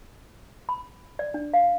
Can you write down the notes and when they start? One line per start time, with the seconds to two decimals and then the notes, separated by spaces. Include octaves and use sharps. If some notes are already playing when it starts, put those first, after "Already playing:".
0.69 B5
1.19 D5
1.34 D4
1.54 F5